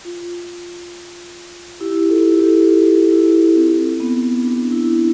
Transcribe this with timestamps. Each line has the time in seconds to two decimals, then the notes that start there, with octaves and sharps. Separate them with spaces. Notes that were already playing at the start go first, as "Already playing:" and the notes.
0.05 F4
1.80 E4 G4
2.09 F4 A4
2.39 E4 G4
2.69 F4
3.12 E4
3.56 C4
4.00 B3
4.44 D4
4.72 E4
4.92 D4